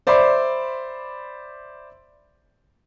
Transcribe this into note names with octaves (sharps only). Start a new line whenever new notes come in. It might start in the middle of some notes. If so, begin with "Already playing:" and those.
C5 D5 E5 B5 C6 D6